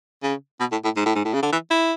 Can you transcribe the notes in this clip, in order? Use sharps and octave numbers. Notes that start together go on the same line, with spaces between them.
C#3
B2
A2
A2
G#2
A2
G#2
A2
C#3
D3
E3
E4